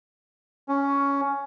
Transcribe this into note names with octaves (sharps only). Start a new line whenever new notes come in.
C#4